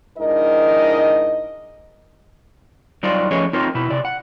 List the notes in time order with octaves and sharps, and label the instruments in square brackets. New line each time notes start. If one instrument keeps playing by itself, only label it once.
[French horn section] G#2 D4 E4 A#4 D#5
[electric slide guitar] F#3 G3 D#4 F4 C5 D5
F3 A3 C#4 G#4 C#5 D#5
C4 D#4 F4 A#4 C#5
B2 E4
C3 D5
F#5